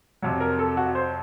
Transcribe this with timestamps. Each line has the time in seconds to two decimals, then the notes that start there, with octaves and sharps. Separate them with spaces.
0.22 F2 C3 F#3
0.40 A#4
0.59 A4
0.77 F#4
0.95 C5